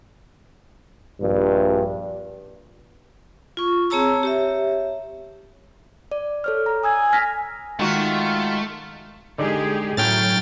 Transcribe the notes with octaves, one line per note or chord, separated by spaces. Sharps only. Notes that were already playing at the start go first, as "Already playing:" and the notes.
A#1 G2
F4 C#6
C4 G#4 C#5 A5 A#5 E6
G4 C#5 E5
D5
A4 C#5 F6
A#5
G#5 D#6 E6 G#6
F6 A#6 B6
D#3 G#3 A3 F4 F#4
D3 G#3 D#4 G4 G#4 D5
A2 F#3 A3 C#4 G5 F6 A6